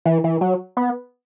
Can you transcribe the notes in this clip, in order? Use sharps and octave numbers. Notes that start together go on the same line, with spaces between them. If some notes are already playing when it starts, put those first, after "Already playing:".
E3
E3
F#3
B3